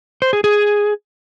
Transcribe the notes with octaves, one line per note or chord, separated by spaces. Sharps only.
C5
G#4
G#4